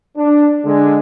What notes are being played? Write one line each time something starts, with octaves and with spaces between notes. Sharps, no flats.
D4
D3 G#3